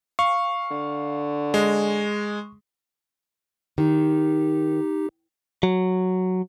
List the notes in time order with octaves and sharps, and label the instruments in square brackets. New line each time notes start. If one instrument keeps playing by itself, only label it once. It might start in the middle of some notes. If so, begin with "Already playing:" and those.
[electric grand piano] F5 [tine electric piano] C#6
[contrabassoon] D3
[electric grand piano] G#3
[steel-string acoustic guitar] D#3 [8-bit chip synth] D#4 G4
[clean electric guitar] F#3